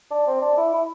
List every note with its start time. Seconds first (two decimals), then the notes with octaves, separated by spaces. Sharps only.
0.11 D4
0.27 C4
0.41 D4
0.57 E4
0.73 E4